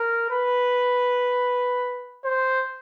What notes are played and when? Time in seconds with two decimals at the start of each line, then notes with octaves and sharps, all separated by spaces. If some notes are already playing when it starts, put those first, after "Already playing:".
Already playing: A#4
0.30 B4
2.25 C5